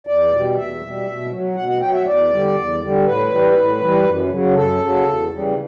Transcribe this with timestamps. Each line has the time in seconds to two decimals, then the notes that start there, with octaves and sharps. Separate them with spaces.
0.07 E2 D5
0.31 B2 G3
0.56 E2 E5
0.82 B2 G3
1.07 B2
1.31 F#3
1.56 B2 F#5
1.69 F#5
1.81 F#3 G5
1.94 E5
2.06 E2 D5
2.31 D3 G3
2.55 E2
2.81 D3 G3
3.05 A2 B4
3.30 E3 G3
3.56 A2
3.80 E3 G3
4.05 F#2
4.29 C#3 F#3
4.54 F#2 A4
4.79 C#3 F#3
5.04 E2
5.29 C#3 E3 G3